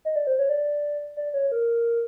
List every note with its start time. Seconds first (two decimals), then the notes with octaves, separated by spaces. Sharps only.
0.05 D#5
0.16 D5
0.27 C5
0.39 C#5
0.49 D5
1.17 D5
1.34 C#5
1.52 A#4